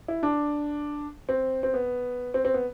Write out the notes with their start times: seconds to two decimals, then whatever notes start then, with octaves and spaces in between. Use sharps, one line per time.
0.08 E4
0.23 D4
1.29 C4
1.63 C4
1.74 B3
2.34 C4
2.45 C4
2.54 B3